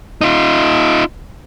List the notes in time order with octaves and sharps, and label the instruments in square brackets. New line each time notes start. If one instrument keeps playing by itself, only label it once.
[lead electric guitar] D#4 F4